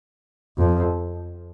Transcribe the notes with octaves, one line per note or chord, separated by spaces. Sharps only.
F2